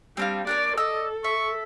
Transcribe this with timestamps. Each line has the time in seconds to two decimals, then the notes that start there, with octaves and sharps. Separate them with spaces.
0.17 G3 C4 D4 F5
0.47 D4 A#4 C#5 D5
0.78 A4 D5 D#5 E6
1.24 E5 C#6